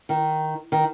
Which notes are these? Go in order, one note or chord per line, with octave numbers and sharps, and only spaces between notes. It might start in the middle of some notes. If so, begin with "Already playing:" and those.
D#3
D#3